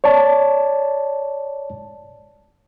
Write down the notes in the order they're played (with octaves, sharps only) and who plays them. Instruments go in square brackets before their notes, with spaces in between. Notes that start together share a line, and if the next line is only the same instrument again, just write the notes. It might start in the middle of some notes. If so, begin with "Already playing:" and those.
[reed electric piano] C#5 D5 A5